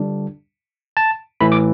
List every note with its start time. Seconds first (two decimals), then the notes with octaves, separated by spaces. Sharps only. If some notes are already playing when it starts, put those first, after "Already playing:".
Already playing: D3 G3 D4
0.97 A5
1.41 A2 E3 A3 E4 B5
1.52 D6